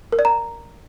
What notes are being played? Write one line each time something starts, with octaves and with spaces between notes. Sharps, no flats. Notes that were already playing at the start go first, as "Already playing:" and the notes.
A#4
D5
A#5